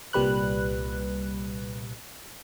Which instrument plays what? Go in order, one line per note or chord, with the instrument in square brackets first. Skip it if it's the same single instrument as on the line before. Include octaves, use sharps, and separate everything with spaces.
[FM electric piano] C2 A#2 G3 B4 F#6